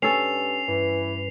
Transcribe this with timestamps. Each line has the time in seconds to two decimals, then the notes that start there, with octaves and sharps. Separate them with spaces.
0.02 G2 C#4 A4 C7 F7
0.68 G2 E3 B4